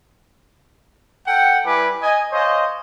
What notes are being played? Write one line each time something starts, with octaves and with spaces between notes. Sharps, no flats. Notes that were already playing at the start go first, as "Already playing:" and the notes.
A4 F#5 G5
G3 E4 B4 G#5 D6
D#5 G#5
C5 C#5 D#5 F5 G#5